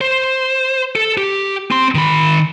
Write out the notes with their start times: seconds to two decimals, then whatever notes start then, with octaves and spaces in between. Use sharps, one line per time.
0.01 C5
0.96 A4
1.18 G4
1.71 C4 C6
1.95 D#3 B5